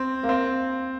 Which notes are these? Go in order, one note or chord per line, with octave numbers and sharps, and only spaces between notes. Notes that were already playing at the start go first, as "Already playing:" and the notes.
Already playing: C4
A#3
C4